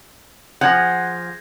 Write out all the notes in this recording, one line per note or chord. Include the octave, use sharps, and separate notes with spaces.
F3 G#4 F#5 G6 G#6 A#6